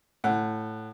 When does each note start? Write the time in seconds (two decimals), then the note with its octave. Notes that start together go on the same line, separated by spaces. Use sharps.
0.24 A2 F#5